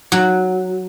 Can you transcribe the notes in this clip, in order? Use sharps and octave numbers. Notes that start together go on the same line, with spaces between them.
F#3